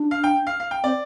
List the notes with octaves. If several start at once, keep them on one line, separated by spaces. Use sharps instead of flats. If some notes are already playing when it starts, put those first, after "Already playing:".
Already playing: D4
F5
G5
F5
F5
G5
C4 D5